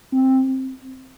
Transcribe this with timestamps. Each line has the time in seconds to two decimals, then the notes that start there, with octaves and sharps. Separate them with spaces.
0.12 C4